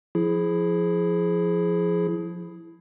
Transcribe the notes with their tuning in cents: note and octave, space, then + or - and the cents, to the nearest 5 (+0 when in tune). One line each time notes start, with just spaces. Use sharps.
F3 +0 E4 +5 G#4 +15